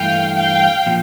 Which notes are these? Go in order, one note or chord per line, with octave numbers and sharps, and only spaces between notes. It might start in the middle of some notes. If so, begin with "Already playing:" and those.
Already playing: G2 E3 A3 F5 G5
F5 G5
A#2 F3